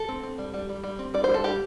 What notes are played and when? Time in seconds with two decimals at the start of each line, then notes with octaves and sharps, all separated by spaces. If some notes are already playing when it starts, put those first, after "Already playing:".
Already playing: A4
0.08 C4
0.23 C4
0.38 G3
0.54 G3
0.69 G3
0.84 G3
0.99 C4
1.14 G3 D5
1.24 C5
1.29 G3
1.34 A4
1.44 G3 G4